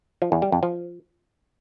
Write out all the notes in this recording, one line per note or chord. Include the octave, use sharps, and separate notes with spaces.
F3
E2
G3
F2
F3